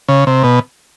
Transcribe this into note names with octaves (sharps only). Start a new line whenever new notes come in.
C#3
C3
B2